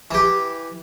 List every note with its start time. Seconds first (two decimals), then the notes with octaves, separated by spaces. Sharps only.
0.11 E3 G4